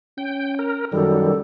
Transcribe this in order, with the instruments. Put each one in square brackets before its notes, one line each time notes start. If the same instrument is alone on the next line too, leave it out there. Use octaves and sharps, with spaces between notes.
[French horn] C#4 [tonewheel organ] G5
[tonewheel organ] A#4
[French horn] F#2 [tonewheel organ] D#3 G3 [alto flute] A4